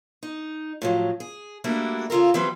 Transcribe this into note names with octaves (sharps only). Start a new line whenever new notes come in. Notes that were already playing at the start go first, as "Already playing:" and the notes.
D#4
A2 F3 F#3
G#4
G3 A3 A#3 D4 E4 F#4
E2 C#3 F4 A4 A#4
E3 F#3 G3 C4 B4